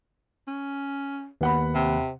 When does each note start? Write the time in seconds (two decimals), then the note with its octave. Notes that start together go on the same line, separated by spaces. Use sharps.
0.48 C#4
1.41 D#2 B3 F#5 B5
1.75 C3